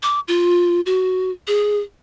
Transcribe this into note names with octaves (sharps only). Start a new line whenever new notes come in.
D6
F4
F#4
G#4